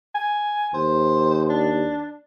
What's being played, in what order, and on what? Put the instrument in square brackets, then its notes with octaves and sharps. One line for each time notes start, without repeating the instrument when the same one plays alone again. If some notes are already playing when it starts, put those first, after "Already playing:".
[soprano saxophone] G#5
[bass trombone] D#2 [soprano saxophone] C5
[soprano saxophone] D4